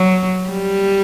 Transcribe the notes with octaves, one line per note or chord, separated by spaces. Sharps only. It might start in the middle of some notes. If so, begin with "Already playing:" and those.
Already playing: F#3
G3